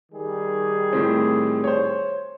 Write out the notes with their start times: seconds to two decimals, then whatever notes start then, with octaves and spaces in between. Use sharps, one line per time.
0.12 D#3 G3 G#4
0.93 A2 C4
1.64 C5 C#5